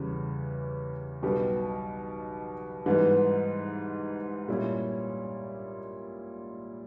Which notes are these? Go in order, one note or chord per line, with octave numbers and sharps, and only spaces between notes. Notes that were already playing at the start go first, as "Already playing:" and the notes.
Already playing: E2 C#3 E3 G3
B1 B2 G3 B3 G4
G#2 E3 G3 B3
A#2 G3 C#4 E4